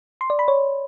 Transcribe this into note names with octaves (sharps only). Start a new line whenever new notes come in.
C6
D5
B5
C#5